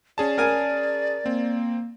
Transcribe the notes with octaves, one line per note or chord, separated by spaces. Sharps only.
C#4 G#4 D5 A5
A#4 G#5
A#3 C4